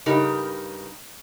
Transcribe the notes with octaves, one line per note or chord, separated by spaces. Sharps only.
G2 C#3 D#4 G4 A#4